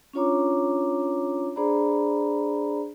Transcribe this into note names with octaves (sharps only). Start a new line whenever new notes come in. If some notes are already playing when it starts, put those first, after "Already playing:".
C#4 D4 F4 C#5 A#5 D6
D4 G#4 C5 D5 A#5 B5